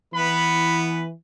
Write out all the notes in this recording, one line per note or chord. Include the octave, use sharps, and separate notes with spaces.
E3 B3 B4 B5